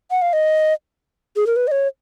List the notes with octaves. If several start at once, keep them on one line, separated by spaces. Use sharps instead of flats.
F#5
F5
D#5
G#4
A#4
B4
D#5
C#5